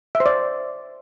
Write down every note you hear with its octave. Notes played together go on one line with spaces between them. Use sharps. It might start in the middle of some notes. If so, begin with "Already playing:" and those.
E5
C5
D5